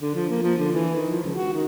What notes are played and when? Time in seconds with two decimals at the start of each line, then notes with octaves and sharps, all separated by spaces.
0.01 D3
0.15 F3
0.30 A#3
0.42 F3
0.58 D3
0.72 E3
0.95 D#3
1.10 F3
1.24 C#2
1.36 F#4
1.53 D#3